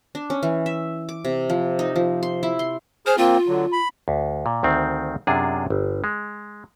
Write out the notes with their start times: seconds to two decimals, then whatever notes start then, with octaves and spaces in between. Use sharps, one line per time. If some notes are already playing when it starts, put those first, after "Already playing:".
0.15 D4
0.30 C#4
0.43 E3
0.66 E5
1.09 D6
1.25 C3
1.50 F3
1.79 D#4
1.96 F3
2.23 C6
2.43 E4
2.59 C6
3.06 G#4 C5 F6
3.18 A#3 C4 F4
3.48 D3 F#3
3.72 B5
4.08 D2
4.46 A#2
4.63 D2 D#3 C4
5.27 F#2 C3 D4 F4 G#4
5.70 G1
6.04 G#3